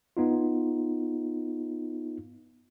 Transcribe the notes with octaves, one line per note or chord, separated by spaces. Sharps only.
B3 D#4 F4